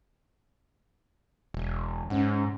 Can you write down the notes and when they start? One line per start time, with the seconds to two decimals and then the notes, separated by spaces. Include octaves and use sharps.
1.54 E1
2.10 G#2 C#4 F#5